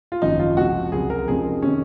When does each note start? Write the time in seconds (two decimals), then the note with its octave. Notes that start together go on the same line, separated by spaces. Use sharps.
0.12 F4
0.22 G#1 F#2 F3 D#4
0.39 F4
0.57 C#2 C3 F3 F#4
0.92 C#2 C3 F#3 G#4
1.10 A#4
1.27 F1 F2 C#3 F3 G#4
1.62 C3 D#3 C#4